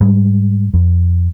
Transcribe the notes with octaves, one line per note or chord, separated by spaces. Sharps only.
G#2 G3
F2